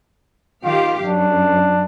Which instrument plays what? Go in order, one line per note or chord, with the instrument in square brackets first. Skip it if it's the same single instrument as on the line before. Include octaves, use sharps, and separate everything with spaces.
[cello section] D#3 G4 F5 [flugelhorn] F4
[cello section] F#2 [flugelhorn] D4